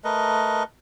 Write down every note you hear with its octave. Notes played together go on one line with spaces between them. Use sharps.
A3 A#4 B4 D#5